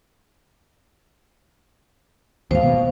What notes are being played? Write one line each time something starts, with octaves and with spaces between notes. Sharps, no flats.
D#2 G#2 C5 F5
B2